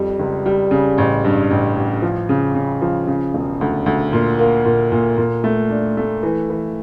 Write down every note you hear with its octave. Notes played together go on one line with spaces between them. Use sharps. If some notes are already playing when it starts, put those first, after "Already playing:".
Already playing: F2 G3
C#2
G3
C#3
A1
G2
A1
A1
F3
C#3
C#3
F3
C#3
E1
D2
D2
A#2
A#3
A#2
A#2
A#2
A3
D4
A3
E3
E3